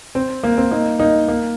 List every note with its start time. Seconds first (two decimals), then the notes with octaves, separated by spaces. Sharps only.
0.15 C4
0.44 A#3
0.58 C4
0.71 A#3 D#4
1.00 A#3 D#4
1.28 A#3